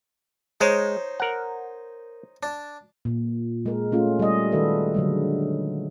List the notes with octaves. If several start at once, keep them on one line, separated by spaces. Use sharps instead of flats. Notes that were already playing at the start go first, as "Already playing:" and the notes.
G#3 D#4 C5 C#5
A#4 F#5
D4
A#2
G#3 A#4
A3 C#4 F4
G3 D#5
D#3 G#3 F#4 A4 B4 E5
D3 F#3 G#3